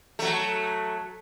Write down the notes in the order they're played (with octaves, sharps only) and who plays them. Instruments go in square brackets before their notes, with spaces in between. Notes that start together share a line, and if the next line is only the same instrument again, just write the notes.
[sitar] F#3 A3